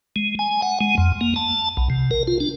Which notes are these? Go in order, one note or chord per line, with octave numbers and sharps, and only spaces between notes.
G#3
G#5
F#5
G#3
F2
A#3
A5
B1
C3
A#4
F4
D4